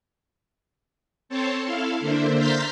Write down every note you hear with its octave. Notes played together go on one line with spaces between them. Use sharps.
C4 A4 C5 C#5 A5
E4 A4 F5
D3 A#3 D4 C5 E5
A#5 C6 F6 G6 A6 B6